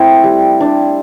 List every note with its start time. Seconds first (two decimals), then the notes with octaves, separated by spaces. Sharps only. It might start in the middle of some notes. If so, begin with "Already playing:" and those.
Already playing: A3 C4 E4 E5 G5
0.24 G3
0.60 D4